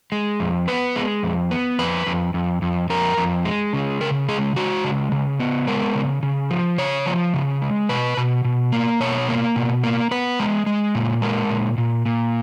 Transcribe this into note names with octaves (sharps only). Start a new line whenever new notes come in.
G#3
F2
B3 B4
G#3
F2
B3
F2 B4
F2
F2
F2
F2 A#4
F2
G#3
C#3
C#3 A#4
G#3 G#4
G#3 F#4
C#3
C#3
B3
G#3 A#4
C#3
C#3
F3
C#3 C#5
F3
C#3
G#3
B2 B4
B2
B2
A#3
B2 C#5
A#3
B2
A#3
B3 B4
G#3
G#3
A#2
G#3 A#4
A#2
A#2
A#2